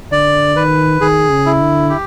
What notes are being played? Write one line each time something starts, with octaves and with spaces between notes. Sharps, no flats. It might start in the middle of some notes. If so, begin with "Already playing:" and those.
D3 D5
D#3 B4
D#3 G#4
C#3
E4
D3
G4